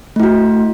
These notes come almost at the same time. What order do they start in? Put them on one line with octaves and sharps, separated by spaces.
A3 E4 F#4